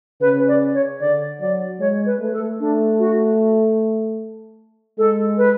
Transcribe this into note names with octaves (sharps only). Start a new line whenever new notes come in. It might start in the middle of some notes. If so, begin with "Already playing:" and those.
C#3 B4
D5
C#5
D3 D5
F#3 D5
G#3 C#5
B4
A3
A4
A3 D4
F#4
G#3 A4
B4